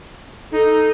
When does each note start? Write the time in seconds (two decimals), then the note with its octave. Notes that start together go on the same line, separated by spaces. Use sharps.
0.52 D#4 A4